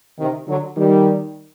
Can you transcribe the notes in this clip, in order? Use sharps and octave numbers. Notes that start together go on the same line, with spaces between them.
C3 D#3
D3 F#3
D#3 G3